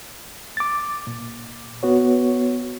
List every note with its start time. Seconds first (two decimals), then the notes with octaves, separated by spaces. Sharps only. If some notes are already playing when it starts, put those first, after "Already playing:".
0.57 D6 A6
1.07 A#2
1.83 B3 F#4 C#5